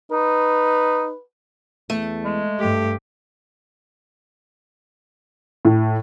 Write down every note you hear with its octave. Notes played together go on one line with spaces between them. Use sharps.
D#4 B4
E2 A3
G#3
G2 A3 G4
A2